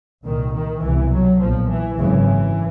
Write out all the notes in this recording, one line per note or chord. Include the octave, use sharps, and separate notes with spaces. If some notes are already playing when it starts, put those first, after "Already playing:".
C2 A#2 D#3
D#3
C2 B2 E3
F#3
B1 A#2 F3
E3
G#1 F#2 C#3 E3